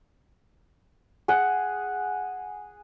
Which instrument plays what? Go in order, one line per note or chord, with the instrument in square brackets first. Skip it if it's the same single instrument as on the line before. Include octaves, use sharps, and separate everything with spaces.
[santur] G#4 F#5